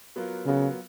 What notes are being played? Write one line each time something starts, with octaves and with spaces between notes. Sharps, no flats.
F#3 B3 F4 A#4
C#3 F#3 B3 F4 A#4